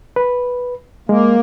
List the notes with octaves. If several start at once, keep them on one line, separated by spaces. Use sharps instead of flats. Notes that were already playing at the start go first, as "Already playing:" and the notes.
B4
G#3 A#3